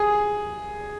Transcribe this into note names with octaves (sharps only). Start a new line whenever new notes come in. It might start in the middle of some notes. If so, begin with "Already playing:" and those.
Already playing: G#4